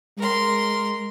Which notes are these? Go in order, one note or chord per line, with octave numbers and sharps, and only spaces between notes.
G#3 A#4 C6